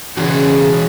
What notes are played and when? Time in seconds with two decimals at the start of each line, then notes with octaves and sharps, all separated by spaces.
0.17 C#3 E3 F#4